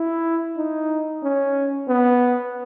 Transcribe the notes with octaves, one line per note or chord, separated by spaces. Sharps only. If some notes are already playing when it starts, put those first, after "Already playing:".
Already playing: E4
D#4
C#4
B3